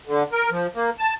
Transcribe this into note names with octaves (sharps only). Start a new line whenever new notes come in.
D3
A#4
F3
A#3
A5